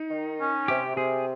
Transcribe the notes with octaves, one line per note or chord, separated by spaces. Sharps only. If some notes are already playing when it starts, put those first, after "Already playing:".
Already playing: D#4
D#3
C#4
C3 G4
C3 G#4